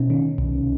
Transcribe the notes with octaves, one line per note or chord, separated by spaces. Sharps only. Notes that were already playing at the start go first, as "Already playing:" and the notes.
Already playing: B2 C#4 D#4
D#3
C2